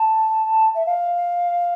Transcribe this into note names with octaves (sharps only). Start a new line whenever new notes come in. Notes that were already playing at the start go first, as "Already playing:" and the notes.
Already playing: A5
E5
F5